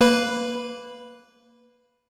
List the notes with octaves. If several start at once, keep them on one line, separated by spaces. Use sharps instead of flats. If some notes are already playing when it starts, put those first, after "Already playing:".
A#3 B4 B5